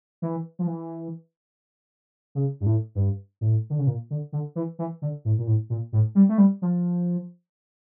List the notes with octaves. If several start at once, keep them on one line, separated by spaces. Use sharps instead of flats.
E3
F3
E3
C#3
G2
A2
G2
A2
D3
C#3
A#2
D3
D3
E3
E3
D3
A2
A#2
A2
A#2
A2
G3
A3
G3
F3